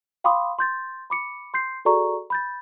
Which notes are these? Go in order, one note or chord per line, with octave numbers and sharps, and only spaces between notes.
F5 G5 B5 C6 D6 D#6
C6 G6 A6
B5 D6 C#7
C6 G6 C7
F#4 G#4 A4 D5 A#5 C#6
B5 G6 A6